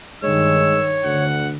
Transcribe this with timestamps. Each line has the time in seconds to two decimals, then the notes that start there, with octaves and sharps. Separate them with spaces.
0.23 G2 D#3 G#3 C#5 E6
1.05 D2 D3 F#5